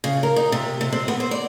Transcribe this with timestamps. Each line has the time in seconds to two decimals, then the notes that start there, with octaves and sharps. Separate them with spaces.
0.04 C#3
0.23 A#4
0.36 D#4
0.52 C3
0.81 C3
0.92 C4
1.08 B3
1.20 C5
1.31 D5